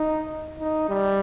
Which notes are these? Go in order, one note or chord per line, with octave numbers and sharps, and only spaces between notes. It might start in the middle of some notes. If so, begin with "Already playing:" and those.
Already playing: D#4
D#4
G3